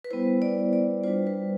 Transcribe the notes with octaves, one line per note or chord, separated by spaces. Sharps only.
B4
G3 B3 E4 C5
D5
D5
G3 D4 F4 C5
B4